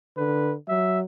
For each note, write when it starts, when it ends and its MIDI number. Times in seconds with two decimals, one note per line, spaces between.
0.17 0.55 50
0.17 0.53 71
0.69 1.03 54
0.69 0.99 76